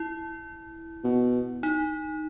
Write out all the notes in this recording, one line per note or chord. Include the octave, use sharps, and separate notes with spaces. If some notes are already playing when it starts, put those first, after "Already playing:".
Already playing: E4
B2
D#4